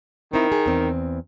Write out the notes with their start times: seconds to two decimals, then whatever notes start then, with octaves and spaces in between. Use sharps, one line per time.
0.33 D#3 C4 E4
0.52 G#4
0.66 E2 C4